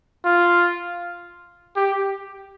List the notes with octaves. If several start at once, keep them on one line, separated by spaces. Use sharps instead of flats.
F4
G4